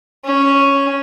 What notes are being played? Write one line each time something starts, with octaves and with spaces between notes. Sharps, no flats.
C#4